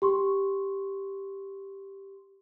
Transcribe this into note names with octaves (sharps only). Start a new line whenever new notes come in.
G4 C6 C#6